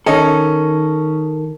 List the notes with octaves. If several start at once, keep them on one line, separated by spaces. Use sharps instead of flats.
D#3 C#4 A4 D#5